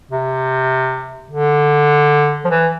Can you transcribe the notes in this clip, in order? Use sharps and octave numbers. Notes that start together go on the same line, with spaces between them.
C3
D3
F3
E3